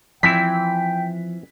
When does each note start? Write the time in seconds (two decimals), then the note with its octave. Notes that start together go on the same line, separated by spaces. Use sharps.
0.23 E3 F3 C4 E4 G5 B6